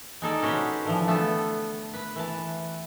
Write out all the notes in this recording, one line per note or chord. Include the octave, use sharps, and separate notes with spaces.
G#3 D#4 A4 D5
C#4 F#4 G4 B4 C5
D3 E3 F3
A3 B3 A4 F5
B4
E3 A5